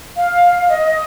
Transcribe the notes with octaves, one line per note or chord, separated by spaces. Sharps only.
F5
D#5